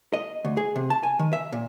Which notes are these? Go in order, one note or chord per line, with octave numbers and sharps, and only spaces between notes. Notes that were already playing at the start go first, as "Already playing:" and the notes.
D#5
D2
G#4
C3
A5
G#5
D#3
E5
A#2